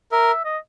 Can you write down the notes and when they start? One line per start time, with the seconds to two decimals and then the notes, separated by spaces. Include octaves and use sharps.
0.12 A#4 E5
0.45 D#5